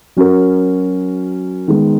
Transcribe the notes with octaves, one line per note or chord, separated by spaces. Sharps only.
F#3 C#4 F#4 A#4
D#3 G#3 B3